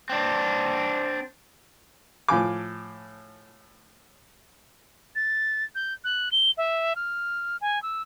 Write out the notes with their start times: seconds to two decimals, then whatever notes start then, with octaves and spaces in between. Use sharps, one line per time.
0.09 C4 D4
2.28 A2 F3 G#5 D6
5.15 A6
5.75 G6
6.04 F#6
6.32 G7
6.57 E5
6.96 F6
7.61 G#5
7.82 E6